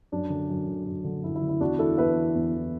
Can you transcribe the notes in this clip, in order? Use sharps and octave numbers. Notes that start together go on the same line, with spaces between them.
F#2 D4
D3
F#2
D3
F#2
D3
F#2 E4
E4
D3
E4
E2 D4 F#4
E3 E4 A4
E2 B4 E5
E3
E2
E3